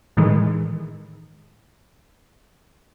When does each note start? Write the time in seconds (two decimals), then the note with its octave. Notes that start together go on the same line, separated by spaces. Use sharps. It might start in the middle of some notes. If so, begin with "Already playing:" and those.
0.17 A2 D#3 E3 G#3